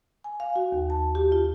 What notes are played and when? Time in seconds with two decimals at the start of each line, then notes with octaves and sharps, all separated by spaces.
0.24 G#5
0.40 F5
0.56 F#4
0.72 D#2
0.90 A5
1.15 G4
1.32 F4